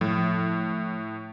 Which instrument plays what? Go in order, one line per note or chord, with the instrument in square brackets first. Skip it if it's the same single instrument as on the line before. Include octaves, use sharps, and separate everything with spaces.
[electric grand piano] A2 [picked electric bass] F3